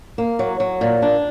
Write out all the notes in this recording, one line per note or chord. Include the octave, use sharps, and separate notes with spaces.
A#3
F#3
F#3
A#2
D4